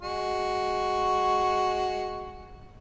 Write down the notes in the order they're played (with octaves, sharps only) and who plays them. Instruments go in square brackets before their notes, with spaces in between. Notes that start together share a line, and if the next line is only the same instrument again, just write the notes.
[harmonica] G#3 F#4 C#6